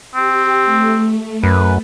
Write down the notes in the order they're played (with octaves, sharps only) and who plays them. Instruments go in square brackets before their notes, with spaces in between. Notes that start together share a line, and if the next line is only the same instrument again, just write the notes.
[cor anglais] C4 [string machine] G4
[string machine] A3
[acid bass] F#2 [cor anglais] B4